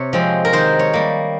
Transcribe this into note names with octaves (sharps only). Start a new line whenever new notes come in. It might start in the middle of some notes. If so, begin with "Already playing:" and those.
Already playing: C3 C#5
F3 G#3 C4
A#4
D#3 C5
C#5
G3 A#3